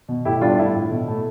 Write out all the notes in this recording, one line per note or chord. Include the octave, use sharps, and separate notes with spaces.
B2
A2 E4 G4
G3 D4 F4
A2 E4
A2
B2
A3